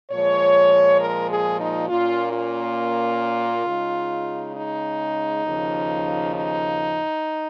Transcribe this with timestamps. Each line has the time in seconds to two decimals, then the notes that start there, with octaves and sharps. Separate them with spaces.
0.11 A#2 F3 G#3 C#5
1.00 A#4
1.30 G#4
1.59 D#4
1.88 A#2 A#3 C#4 F4
2.33 F4
3.66 C#3 G#3 D#4
4.54 D#4
5.43 D#2 C#3 F3
6.32 D#4